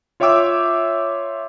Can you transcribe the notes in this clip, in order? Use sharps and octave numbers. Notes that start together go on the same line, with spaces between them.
F4 C#5 E5 G5 D6 E6